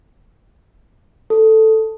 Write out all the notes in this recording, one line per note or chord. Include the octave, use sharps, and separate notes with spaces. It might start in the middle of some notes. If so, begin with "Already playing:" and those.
A4